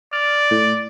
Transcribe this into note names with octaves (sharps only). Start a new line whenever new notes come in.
D5 F6
A2